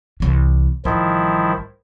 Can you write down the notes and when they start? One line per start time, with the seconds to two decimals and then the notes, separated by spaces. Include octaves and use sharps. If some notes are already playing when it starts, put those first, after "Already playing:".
0.20 C2 E3
0.85 A1 D#3 F3 G3 E4